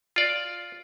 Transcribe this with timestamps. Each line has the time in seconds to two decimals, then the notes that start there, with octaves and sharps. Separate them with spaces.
0.16 F4 D5